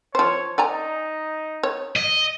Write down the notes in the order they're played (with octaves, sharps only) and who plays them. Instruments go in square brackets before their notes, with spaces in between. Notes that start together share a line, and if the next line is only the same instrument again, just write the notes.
[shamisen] F3 C5 [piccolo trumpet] C#5
[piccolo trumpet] D#4 [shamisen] D5 G#5 A#5
[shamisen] C#5
[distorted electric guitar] D#5